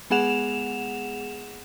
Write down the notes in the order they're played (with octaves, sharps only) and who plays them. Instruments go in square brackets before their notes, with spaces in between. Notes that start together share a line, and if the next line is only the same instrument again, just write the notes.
[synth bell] G#3 B3 G#4 F#5 E7 F7